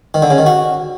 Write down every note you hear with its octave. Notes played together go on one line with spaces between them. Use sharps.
D#3
D3
C#3
D#3
F#4